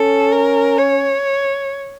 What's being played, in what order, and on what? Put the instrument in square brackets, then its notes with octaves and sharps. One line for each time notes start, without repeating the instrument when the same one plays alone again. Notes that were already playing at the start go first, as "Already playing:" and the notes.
Already playing: [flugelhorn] C#4 [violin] A4
[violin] A#4
C#5